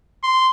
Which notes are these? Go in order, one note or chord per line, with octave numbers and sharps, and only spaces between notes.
C6